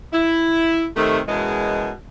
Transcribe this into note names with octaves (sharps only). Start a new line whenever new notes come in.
E4
C3 D#3 A3
F#2 B2 E3 G#3